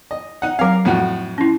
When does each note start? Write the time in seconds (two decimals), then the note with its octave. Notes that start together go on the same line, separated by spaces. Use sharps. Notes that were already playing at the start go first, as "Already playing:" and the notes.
0.11 D#5
0.42 D#4 F#5
0.59 F#3 C4 A#4 F5
0.85 F2 A2 F#4
1.38 C#4 E4